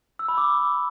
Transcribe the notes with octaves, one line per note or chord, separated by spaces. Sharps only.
E6
B5
D6